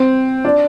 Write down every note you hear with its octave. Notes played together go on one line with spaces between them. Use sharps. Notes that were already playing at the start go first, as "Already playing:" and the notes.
Already playing: C4
D4